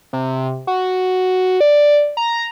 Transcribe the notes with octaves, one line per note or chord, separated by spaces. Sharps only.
C3
F#4
D5
A#5